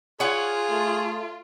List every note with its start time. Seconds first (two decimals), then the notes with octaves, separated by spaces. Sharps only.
0.20 F4 G#4 C#5 F#5
0.71 A3